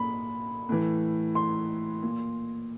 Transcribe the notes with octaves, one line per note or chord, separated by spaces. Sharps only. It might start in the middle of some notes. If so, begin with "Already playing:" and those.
Already playing: A#2 B5
A2 E3
C6
A#2